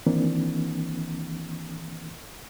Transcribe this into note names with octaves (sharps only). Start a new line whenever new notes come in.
D#3 E3 A#3 C4 D4